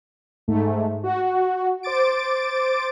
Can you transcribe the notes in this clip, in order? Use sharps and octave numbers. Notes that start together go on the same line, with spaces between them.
G#2 A3
F#4
C5 D6 A6 D7